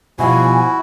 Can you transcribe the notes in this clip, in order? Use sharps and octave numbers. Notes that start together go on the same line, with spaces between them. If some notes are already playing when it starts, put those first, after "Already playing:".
B2 F3 G3 E4 F#4 F5 G#5